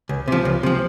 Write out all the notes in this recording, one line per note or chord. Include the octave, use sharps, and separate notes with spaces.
C#2
C3 F3
C#2
C3 F3